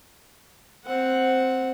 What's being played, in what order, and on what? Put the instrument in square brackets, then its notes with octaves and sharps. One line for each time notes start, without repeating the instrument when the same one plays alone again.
[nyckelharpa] C4 F#5